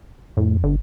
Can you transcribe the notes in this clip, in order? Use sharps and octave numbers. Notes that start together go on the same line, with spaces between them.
F2 A2
G1 D3